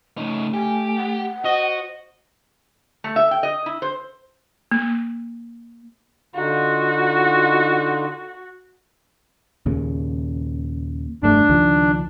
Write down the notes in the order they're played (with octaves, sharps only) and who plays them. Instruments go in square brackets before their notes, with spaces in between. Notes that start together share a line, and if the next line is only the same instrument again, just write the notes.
[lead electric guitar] C#3 D#4 [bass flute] A3
[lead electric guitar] G4 [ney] G#5
[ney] F#5
[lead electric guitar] F#4 [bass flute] C5 [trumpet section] D#5
[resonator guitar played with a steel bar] A3
E5
G5
D#5
E4
C5
[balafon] A#3
[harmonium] D3 D#4 F4 [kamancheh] F#4
[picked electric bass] D#2 A#2 C#3
[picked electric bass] F1 G2 A3 [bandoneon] D4
[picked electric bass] C#2 D#3 F3